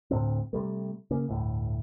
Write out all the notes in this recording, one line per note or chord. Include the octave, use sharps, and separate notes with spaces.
D2 A2 G3 C4
C3 G3 A3
C#3 A#3
G1 D2 A2